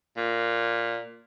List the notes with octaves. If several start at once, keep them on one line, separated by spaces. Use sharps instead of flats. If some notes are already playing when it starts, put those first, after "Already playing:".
A#2